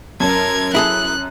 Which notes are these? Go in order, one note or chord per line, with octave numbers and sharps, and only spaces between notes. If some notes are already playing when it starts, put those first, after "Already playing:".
F#2 A#4 A5 G#6
E4 G#4 A4 F#6